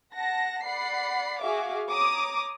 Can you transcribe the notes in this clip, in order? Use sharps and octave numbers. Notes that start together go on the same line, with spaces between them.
F#5 A5 A#6
D5 F#5 B5 C7
F#4 G#4 E5 F5 D6
C#5 A#5 D6 D#6